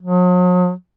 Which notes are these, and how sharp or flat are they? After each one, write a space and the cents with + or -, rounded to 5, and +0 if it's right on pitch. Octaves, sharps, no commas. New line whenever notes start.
F#3 -45